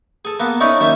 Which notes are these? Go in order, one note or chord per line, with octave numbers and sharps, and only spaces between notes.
G#4 A4
A#3 B3 A4
C#4 D#4 E4 C#5 D5
D#2 G3 C#4 E5